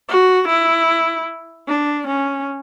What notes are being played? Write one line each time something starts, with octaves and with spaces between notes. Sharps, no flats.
F#4
E4
D4
C#4